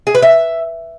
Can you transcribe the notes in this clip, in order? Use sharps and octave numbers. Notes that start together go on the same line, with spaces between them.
G#4
B4
E5